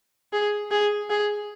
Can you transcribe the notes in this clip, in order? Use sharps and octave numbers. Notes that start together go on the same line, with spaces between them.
G#4
G#4
G#4